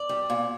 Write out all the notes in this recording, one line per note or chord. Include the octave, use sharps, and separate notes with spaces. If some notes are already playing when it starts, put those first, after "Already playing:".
Already playing: D5
G3
A#2